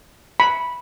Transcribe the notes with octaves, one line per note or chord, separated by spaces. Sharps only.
B5